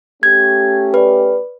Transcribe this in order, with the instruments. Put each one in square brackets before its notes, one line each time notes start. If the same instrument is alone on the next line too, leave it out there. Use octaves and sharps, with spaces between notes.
[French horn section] A3 C#4 G4 [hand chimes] G#6
[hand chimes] B4 D5